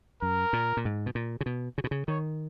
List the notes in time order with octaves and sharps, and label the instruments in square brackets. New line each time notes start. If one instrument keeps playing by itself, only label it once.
[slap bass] F#2 [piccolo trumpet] A#4
[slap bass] A#2
A#2
G#2
B2
A#2
C#3
B2
C#3
B2
C#3
[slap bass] D#3 [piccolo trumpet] C#5